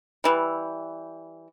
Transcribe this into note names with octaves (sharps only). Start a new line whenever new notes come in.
E3 G3